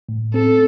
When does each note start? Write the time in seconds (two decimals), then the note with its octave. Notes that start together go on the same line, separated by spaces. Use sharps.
0.09 A2
0.34 C4 A4